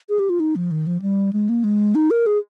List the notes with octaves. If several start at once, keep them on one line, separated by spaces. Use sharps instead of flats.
G#4
G4
F4
D#4
F3
D#3
F3
G3
G#3
A#3
G#3
D#4
A#4
G#4